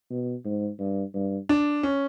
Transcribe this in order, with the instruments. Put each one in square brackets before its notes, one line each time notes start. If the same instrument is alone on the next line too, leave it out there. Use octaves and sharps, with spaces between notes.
[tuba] B2
G#2
G2
G2
[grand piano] D4
C#4